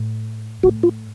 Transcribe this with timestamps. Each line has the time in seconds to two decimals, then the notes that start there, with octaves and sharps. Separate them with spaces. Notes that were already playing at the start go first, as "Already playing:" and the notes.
Already playing: A2
0.63 A2 F#4
0.83 F4